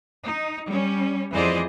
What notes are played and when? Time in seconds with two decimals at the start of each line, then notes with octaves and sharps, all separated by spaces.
0.23 D#4
0.68 G3 C#4
1.32 F2 E3 G#4 C5 D5 D#5